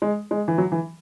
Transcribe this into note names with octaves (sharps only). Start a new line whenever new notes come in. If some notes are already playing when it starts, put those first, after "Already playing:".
G#3
G#3
E3
F#3
E3